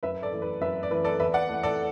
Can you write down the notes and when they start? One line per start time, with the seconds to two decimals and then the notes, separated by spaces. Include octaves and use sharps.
0.03 F#2 B4 E5
0.22 A4 D5
0.32 E3 A3
0.42 B4
0.61 F#2 B4 E5
0.83 D5
0.91 E3 A3 B4
1.04 A4 D5
1.19 E2 B4 E5
1.34 D5 F#5
1.49 E3 A3
1.63 A4 D5